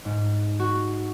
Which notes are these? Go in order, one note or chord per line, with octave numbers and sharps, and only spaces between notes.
G#2
F#4